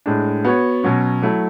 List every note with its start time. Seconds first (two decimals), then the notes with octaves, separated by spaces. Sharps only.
0.06 A2 G#3 D4
0.45 B3 F#4 C#5
0.83 B2 F#3 C#4
1.22 F#3 A3 E4